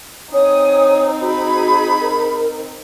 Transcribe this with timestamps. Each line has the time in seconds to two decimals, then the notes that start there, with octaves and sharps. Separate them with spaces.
0.33 C4 D#4 C#5 G#5 D#6
1.21 F#4 G#4 B5
2.02 A#4